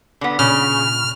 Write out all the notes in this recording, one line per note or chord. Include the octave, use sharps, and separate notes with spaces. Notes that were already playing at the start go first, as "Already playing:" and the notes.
D3 B3
A#2 C#3 F6